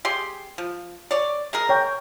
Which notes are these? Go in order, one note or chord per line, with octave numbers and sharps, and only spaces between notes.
G4 G#4 C6
F3
C#5 D5
G#3 G#4 A#4
C#5 G5